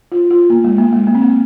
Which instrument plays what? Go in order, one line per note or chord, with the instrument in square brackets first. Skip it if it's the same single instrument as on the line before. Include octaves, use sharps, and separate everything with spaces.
[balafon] F4
F4
A#3
G#3
A#3
G#3
A#3
C4
A#3